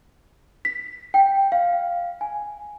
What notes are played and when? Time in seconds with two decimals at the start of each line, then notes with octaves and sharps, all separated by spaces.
0.65 B6
1.14 G5
1.52 F5
2.21 G#5